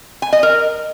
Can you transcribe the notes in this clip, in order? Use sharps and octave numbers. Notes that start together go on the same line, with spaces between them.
G#5
D#5
A#4